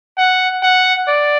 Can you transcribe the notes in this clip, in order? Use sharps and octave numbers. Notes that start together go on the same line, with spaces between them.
F#5
F#5
D5